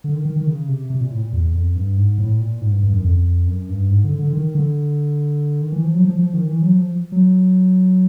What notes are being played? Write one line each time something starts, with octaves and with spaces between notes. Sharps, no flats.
D3
D#3
D#3
D#3
C#3
C3
C3
A#2
A2
A#2
E2
F2
G2
G#2
A2
A#2
G#2
G2
G2
F#2
F2
F#2
G2
G#2
D3
D3
D#3
D3
D#3
E3
F3
F#3
F3
F3
D#3
E3
F#3
F3
F#3